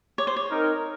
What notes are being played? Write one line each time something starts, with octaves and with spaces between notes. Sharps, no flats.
C#5
C5
C#5
C4 D#4 A#4